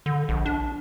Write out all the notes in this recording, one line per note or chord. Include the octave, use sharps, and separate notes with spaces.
D3
A#1
D4